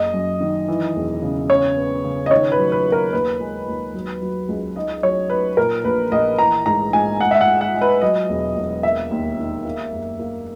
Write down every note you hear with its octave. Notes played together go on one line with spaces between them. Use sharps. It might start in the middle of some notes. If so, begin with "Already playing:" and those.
Already playing: F#1 D#5
F#2
D#3
E3
E1
C#3
C#3 C#5
B3
C#3
D#5
D#3 C#5
B4
F#3
B4
A#3
A#4
D#2 B4
G#3
D#2
F#3
F#3
C#2
D#4 D#5
F#3 C#5
D#4 B4
A#2 A#4
A#1 B4
A#1 D#5
E3 A#5
G#2 A#5
G#2 G#5
G#3 F#5
E5
F#5
G#3
F#5
G#3
B4
F#3 D#5
E1
E1
A#3 E5
D#2
D#3
A#3
F#1
A#3